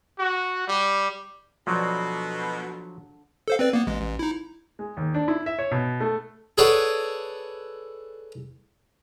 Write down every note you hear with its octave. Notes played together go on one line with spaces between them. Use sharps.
F#4
G3
B2 D3 F3 F#3 A4
A4 C5 F5
C4 B4 D5
A#3 B3
A1 G#3
A1
D#4 E4
G#3
D#2
D4
E4
E5
C#5
B2
A3
G#4 A4 B4 C#5 D5 F#5